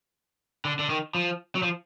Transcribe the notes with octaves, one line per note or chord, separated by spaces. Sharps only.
D3
D3
D#3
F3
F#3
F3